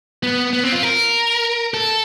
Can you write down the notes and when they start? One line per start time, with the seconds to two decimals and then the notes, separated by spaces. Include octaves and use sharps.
0.23 B3
0.53 B3
0.64 C4
0.72 F4
0.83 A#4
1.74 A4